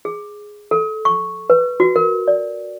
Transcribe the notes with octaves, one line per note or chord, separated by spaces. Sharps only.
G#4
A4
C#6
B4
F#4
A#4
D5